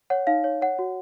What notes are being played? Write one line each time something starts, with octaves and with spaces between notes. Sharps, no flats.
C#5 F#5
D#4 F5
C#5
C#5 F#5
F#4